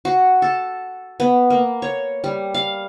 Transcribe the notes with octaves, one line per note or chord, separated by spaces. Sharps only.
F#4
A4
B3
A#3
C#5
G3
F5